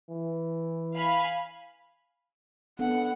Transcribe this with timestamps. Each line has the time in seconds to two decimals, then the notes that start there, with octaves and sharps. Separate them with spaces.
0.10 E3
0.95 F5 G#5 B5
2.79 B3 D4 A4 F#5